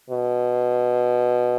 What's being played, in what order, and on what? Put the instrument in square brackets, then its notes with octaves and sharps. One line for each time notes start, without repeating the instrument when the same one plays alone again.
[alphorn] B2